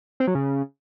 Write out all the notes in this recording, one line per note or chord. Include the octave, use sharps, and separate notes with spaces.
C4
F#3
C#3